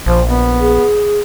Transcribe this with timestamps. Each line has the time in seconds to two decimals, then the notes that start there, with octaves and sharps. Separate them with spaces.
0.06 A#1 F3
0.28 B3
0.60 G#4